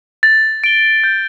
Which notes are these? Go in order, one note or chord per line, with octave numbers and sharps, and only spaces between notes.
A6
D7 G7
G6